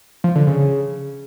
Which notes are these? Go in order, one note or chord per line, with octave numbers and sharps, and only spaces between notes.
F3
D3
C#3